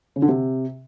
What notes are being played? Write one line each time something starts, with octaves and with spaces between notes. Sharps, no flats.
C#3
D3
C3